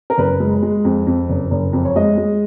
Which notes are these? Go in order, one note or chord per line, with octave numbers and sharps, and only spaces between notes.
A#4
F#1 B4
G#3
G#3
F2
F2
F#1
F#1
F2
C#5
G#3 D#5
G#3